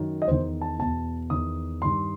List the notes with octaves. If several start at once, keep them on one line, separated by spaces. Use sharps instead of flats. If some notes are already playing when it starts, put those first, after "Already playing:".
Already playing: F#2 D#3
D#5
E2 D#3 C5
A5
E2 B2 A5
E2 D#3 D#6
G2 D#3 C6